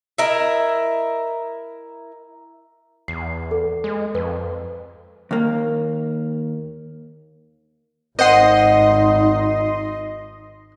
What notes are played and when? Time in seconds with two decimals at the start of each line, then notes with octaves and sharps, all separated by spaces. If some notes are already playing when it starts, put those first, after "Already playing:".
0.18 E4 A#4 D#5 E5
3.08 E2 C7
3.51 A4
3.84 G#3
4.15 F2 B4
5.31 D#2 A#3
8.19 G#1 D#4 C5 D#5 F#5 C6